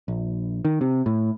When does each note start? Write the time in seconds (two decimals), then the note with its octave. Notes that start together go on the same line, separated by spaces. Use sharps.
0.08 A#1
0.65 D#3
0.81 C3
1.06 A2